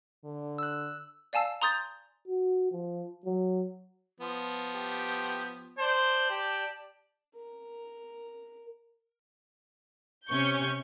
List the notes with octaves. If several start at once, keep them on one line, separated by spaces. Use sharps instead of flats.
D3
E6 F#6
D5 F5 G#5 A5 E6 C7
A#5 C6 D#6 G6 A6
F#4
F3
F#3
F3 B3
G4
C5 D5 A5
G4
A#4
C3 C#4 C#6 G6